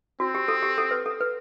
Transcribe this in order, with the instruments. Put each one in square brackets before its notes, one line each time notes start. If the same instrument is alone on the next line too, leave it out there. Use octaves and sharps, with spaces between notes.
[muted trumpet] C4 [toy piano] F#4
[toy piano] G4
A4
G4
A4
B4
A4
B4